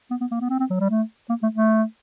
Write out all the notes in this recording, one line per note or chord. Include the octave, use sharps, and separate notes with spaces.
B3
B3
A#3
B3
C4
C4
F#3
G3
A3
A#3
A3
A3